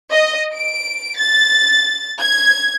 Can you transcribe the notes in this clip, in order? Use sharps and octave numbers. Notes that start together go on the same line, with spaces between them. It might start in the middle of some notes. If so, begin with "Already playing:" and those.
D#5
D7
A6
G#6